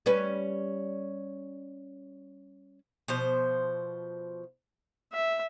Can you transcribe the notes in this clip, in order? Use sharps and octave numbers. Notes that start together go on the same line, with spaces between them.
G3 C#4 B4
B2 F3 C5
E5